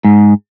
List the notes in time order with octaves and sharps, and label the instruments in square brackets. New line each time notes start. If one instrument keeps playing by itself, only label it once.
[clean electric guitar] G#2